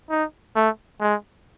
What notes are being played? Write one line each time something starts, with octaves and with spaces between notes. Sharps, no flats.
D#4
A3
G#3